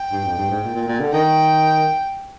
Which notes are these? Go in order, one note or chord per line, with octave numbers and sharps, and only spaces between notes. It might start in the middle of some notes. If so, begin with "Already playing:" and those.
Already playing: G5
G2
F2
G2
G#2
A#2
A#2
A#2
D3
D#3 G5